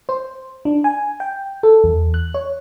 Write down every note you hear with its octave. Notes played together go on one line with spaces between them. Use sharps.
C5
D4
G#5
G5
A4
E2
F#6
C#5